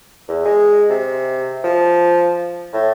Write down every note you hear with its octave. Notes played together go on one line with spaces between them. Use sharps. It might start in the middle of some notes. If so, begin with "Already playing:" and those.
E2
G#3
C3
F3
A2